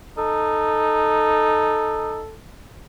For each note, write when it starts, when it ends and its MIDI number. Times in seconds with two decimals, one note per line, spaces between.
0.18 2.20 63
0.18 2.35 69